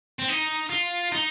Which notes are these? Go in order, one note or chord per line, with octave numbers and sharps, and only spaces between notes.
C4
D#4
F4
D#4